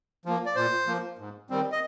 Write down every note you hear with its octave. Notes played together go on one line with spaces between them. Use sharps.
F3 A#3
D5
A#2 C5
F3 A#3
G#2
D#3 G3 C4
D#5